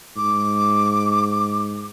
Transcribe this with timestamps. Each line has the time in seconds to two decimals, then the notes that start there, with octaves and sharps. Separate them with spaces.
0.16 G#2 D6